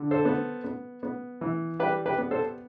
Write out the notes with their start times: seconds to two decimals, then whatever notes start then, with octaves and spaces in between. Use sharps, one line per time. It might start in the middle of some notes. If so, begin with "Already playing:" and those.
Already playing: D3
0.11 A4 C5
0.25 B3
0.64 B3
1.03 B3
1.41 E3
1.79 G3 G4 B4
2.06 G4 B4
2.18 B3
2.31 A4 C5